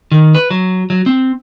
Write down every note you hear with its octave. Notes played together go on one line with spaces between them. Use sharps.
D#3
B4
F#3
F#3
C4